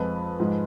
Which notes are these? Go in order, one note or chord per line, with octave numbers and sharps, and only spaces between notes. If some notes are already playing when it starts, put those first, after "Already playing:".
Already playing: F2 F3 G#3 B4
G#2 F3 G#3